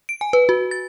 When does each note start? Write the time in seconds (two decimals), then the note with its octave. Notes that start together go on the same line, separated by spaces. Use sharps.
0.09 D7
0.21 G#5
0.33 B4
0.49 F#4
0.71 A6